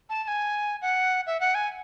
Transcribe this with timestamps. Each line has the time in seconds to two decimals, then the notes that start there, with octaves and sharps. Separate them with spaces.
0.10 A5
0.24 A5
0.28 G#5
0.82 F#5
1.27 E5
1.40 F#5
1.55 G#5